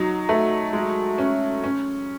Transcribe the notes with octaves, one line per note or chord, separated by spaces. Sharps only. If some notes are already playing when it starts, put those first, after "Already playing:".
Already playing: F#3 D#4
A3
G#3
C#4
C#4